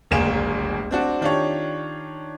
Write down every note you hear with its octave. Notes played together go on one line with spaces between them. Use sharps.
D1 G1 C#2 A#3 G#5 E7
C4 D4 F#4
D#3 D4 F4 G4 C#5